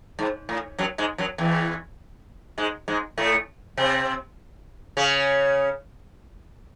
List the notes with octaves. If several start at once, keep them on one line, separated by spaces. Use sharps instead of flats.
G#2
A2
F#2 F#3
G#2 G#3
F#2 F#3
E2 E3
G#2 G#3
G#2 G#3
A2 A3
C3 C4
C#3 C#4